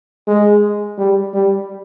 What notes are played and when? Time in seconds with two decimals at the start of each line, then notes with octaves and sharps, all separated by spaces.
0.27 G#3
0.98 G3
1.34 G3